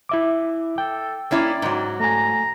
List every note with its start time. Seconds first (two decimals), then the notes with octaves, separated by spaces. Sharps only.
0.09 E4 E5 D6
0.78 A4 G5
1.31 A#3 C#4 E4 D5
1.62 G#2 F#3
2.00 A3 G#5 A#5